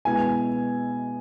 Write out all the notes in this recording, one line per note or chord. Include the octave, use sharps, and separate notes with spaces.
B2 G#3 B3 E4 G#5